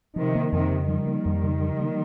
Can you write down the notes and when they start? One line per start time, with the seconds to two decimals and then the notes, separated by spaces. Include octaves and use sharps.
0.16 C3 D#3 F3
0.35 A#3
0.52 F2 C3 D#3
0.70 C#3
0.88 D#3 F3 G3
1.07 A#3
1.25 F2
1.44 C#3
1.62 F3
1.80 A#3